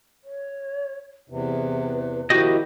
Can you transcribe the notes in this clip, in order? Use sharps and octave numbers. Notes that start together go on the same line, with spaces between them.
C#5
E2 C3 B4
B2 D#3 F3 E4 F#4 G4 D#5